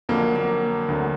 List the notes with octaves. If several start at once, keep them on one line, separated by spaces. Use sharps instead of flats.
F2 D3 F#3 A#3
A#3
D2 D3 F#3